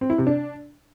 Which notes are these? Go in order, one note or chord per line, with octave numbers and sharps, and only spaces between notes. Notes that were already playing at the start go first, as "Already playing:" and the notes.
C4
E4
C3
D4